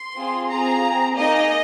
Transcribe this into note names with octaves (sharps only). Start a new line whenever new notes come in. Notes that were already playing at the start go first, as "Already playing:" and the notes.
Already playing: C6
C4 F4 G#4
C4 F4 G#4 A#5
C4 G#4
A#3 D#4 G#4 D#5